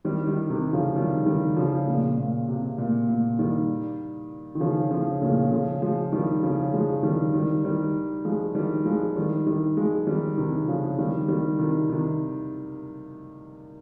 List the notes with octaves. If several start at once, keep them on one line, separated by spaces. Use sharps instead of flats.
D#3 G3
D#3 G3
C3 D#3
C#3 F3
D#3 G3
D#3 G3
C#3 F3
A#2 C#3
A#2
C3
A#2
A#2
D#3 G3
D#3
C#3 F3
C#3 F3
A#2 C#3
C#3 F3
F3 G#3
D#3 G3
C#3 F3
F3 G#3
D#3 G3
D#3 G3
D#3 G3
F3 G#3
D#3 G3
F3 G#3
D#3 G3
D#3 G3
F3 G#3
D#3 G3
C3 D#3
C#3 F3
D#3 G3
D#3 G3
C3 D#3
C3 D#3